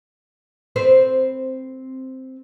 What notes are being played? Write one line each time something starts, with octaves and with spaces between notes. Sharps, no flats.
C4 B4 C5